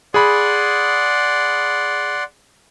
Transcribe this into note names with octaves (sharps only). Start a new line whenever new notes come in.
G#4 D5 F#5 B5 C6